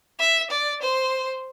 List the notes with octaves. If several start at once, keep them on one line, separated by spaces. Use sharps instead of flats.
E5
D5
C5